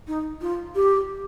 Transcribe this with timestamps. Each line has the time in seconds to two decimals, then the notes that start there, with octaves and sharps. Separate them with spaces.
0.07 D#4
0.41 F4
0.75 G4